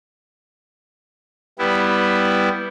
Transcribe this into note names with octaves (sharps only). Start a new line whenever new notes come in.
G3 B3 E4